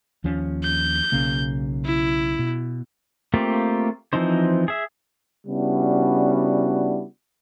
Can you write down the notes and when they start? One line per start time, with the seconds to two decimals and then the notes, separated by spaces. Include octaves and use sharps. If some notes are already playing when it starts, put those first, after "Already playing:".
0.24 D#2 F3 C#4
0.63 G6
1.12 B1 C#3 A#3
1.85 E4
2.39 B2
3.34 A3 A#3 C4 F4 G4
4.13 E3 F3 C4 D#4 C5
4.68 G#4 E5
5.47 C#3 G3 B3 D4 E4 F#4